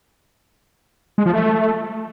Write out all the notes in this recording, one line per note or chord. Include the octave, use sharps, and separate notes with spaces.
G#3
F3
A3